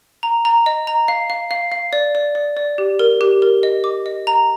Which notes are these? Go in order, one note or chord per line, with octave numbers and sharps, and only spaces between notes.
A#5
A#5
D#5
A#5
F5
F5
F5
F5
D5
D5
D5
D5
G4
A#4
G4
A#4
D#5
D6
D#5
A#5